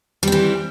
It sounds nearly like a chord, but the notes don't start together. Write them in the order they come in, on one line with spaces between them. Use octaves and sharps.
G3 C4 E3